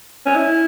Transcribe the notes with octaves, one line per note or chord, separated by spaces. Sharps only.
C#4
E4